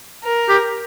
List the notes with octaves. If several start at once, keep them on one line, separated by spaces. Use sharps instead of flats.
A#4
G4